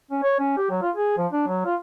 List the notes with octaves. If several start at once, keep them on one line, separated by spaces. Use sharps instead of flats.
C#4
C#5
C#4
G4
F#3
F4
G#4
F3
D4
F#3
F4